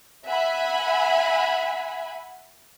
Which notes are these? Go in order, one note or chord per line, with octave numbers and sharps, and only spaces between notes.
E5 F#5 G#5 B5